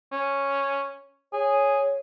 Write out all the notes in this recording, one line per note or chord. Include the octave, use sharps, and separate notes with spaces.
C#4
G#4 C#5